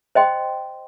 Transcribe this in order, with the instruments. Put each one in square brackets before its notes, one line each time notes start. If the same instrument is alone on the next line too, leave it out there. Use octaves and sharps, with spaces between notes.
[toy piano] C5 D#5 G5 C6